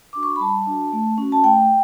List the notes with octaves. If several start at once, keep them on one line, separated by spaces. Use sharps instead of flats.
D4 F#4 D6
C#6
B5
G3 A5
D4 F#4
A3
C#4 F#4
A5
A3 G5